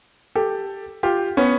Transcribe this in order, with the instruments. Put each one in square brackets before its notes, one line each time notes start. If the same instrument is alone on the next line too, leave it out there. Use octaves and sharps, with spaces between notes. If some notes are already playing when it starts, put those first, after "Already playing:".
[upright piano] G4 A4
F4 G4
B3 C#4